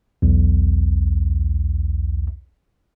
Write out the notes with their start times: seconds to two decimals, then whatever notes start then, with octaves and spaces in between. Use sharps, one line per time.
0.22 B1 E2